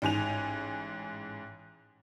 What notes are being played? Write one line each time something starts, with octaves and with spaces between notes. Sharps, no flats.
A1 G#2 G#5 F7